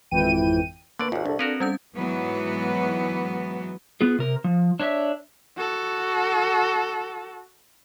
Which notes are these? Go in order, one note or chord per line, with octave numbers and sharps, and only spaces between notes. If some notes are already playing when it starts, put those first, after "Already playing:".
G#1 F2 E3 G5 D#7
D3 A#3 B4 D5 C#6
G#1 D#2 F4
C2 D4 A4
C4 F#4 A#4 B4
G3 C#4 G6
G#2 E3 F#3 B3
B3 F4 G#4
C3 A#4
F3
D4 C#5 D#5 E5
F#4 A4